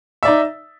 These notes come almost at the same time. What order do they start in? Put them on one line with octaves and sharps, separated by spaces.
E5 D5 D#4